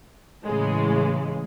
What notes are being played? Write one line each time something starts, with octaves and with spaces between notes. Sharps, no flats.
A2 C#3 E3 G#3